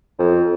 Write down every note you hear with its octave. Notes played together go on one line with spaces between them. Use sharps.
F2